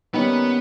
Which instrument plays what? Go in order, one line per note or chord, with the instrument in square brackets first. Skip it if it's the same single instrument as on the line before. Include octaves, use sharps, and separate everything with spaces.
[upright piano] D#3 G3 A#3 C#4 [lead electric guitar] B3